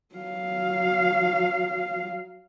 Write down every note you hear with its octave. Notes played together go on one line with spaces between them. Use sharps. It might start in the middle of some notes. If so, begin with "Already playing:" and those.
F#3 F5